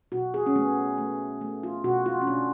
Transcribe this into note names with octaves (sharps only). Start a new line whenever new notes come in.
B2 F#4
G#4
C#4
A3 B3
A3
A3
F4
B2 F#4
F4
C#4
B2 D4